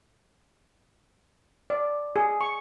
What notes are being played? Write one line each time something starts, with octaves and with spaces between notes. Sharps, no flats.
D5
G#4
C#6